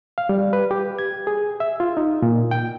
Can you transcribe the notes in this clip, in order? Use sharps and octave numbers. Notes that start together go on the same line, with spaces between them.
F5
G3
B4
G4
G#6
G#4
E5
F4
D#4
A#2
G5